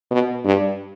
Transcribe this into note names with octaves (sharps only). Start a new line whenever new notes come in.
B2
G2